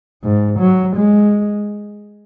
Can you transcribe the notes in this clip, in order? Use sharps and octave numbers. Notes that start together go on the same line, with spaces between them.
G#2
F#3
G#3